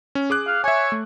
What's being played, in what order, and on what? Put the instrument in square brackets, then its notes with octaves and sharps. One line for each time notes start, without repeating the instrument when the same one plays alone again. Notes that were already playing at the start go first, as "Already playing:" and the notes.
[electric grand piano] C#4
G#4 D6 F#6
[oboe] F5
[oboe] C#5 [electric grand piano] E5 G#5
[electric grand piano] A3